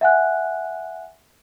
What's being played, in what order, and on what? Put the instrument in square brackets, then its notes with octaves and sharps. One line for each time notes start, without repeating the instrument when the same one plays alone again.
[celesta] E5 F#5 G#5 F#6